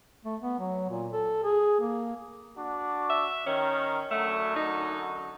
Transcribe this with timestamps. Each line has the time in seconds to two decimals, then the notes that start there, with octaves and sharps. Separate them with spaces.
0.24 A3
0.41 B3
0.59 F#3
0.89 A#2
1.12 A4
1.44 G#4
1.80 A#3
2.57 D4 F#4
3.10 E5
3.47 D#3 C#4
4.11 F#2 D3 A3 F#4
4.56 D#4